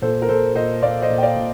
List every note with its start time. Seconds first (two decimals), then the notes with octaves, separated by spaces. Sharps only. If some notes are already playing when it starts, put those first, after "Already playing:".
0.02 A#2 A4 C5
0.22 A#4
0.29 A#2 A4 C5
0.55 A#2 C5 D#5
0.82 A#2 D5 F5
1.02 C5 D#5
1.10 A#2
1.18 G5
1.23 D5 F5
1.36 A#2